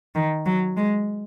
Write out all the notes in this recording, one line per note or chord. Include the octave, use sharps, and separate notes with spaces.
D#3
F#3
G#3